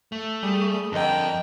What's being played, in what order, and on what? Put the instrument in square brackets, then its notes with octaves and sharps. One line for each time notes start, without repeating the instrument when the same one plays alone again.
[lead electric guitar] A3
[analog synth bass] G3 [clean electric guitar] G#4 [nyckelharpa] D#6
[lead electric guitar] F2 [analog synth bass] D3 [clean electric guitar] A#4 D#5 [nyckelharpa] G5 A#5